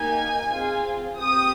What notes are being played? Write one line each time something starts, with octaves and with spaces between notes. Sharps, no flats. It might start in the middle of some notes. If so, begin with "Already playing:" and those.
Already playing: A#3 D#4 G4 G#5
C4 F4 G#4
C4 G4 D#6